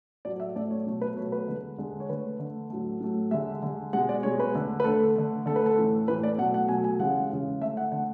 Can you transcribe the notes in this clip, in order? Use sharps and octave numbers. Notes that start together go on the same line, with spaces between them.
A2 F#3 A3 D5
E5
A2 F#3 A3 D5
C#5
B2 F#3 A3
B4
B2 F#3 A3 C#5
B4
D3 G#3
D3 G#3
C#5
D3 A3 B4
D3 A3
A2 F#3 A3
A2 F#3 A3
D3 G#3 E5
D3 G#3
B2 G#3 F#5
D5
B2 G#3 C#5
B4
D3 A3
B4
D3 A3 A4
D3 A3
D3 A3 A4
B4
A4
A2 E3 A3
A2 E3 A3 B4
D5
B2 F#3 A3 F#5
F#5
B2 F#3 A3 G#5
G#5
C#3 E3 G#3 F#5
C#3 E3 G#3
D3 A3 E5
F#5
D3 A3 F#5